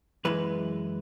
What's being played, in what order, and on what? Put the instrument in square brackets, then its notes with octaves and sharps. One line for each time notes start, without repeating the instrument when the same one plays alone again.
[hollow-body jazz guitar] F#2 E3 G#3 B4